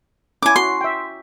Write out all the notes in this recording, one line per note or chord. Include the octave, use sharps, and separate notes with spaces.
C#4 E4 G#5 D6
F#4 C6
E5 G5